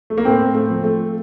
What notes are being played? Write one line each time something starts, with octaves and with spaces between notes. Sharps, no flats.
A3
A#3
A2 A3 C4
A3 C4
F3
A3